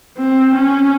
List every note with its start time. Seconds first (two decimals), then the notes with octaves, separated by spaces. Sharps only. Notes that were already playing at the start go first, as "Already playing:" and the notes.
0.18 C4
0.55 C#4